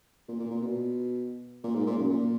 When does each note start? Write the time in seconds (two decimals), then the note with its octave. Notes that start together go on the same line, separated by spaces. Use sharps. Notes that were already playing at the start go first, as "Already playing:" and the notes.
0.28 A#2
0.39 A#2
0.50 A#2
0.62 B2
1.64 A#2
1.75 G#2
1.86 A#2
1.97 F#2
2.09 A#2